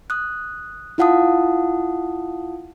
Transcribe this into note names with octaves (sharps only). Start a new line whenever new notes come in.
D#6 F#6
E4 F4 F5 F#5 A5 D#6